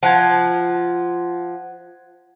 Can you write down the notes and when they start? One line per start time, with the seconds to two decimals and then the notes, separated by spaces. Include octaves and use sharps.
0.03 F3 F#5 F#6 G#6